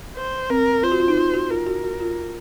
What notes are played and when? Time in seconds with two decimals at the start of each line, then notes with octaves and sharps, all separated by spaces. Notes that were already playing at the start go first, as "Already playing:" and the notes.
0.16 C5
0.50 C4 A#4
0.83 F4 C5
0.92 F#4
1.00 F4
1.08 D#4
1.17 F4
1.34 F#4
1.50 F4 A#4
1.67 F#4
1.83 F#4
2.00 F4